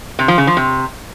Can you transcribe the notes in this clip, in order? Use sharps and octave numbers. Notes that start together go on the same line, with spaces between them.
C3
F3
C#3
F3
C3